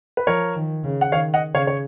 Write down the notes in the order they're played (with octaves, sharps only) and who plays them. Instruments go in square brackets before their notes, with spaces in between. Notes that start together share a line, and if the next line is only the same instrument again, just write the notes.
[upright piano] B4
[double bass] F3 [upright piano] A#4 C#5
[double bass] D#3
C#3
[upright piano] F#5
[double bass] D#3 [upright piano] C#5 F5
[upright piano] D#5 F#5
[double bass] C#3 [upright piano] C#5 F5
[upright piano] C#5